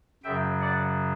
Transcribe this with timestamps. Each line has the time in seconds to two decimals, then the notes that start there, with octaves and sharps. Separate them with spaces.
0.24 F#2 C#3 F#3 E5 G5
0.61 D5 F#5